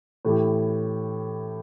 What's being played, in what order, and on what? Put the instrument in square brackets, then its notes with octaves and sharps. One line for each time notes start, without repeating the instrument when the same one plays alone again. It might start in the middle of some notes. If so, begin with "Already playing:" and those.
[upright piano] A2 E3 A3 E4 G4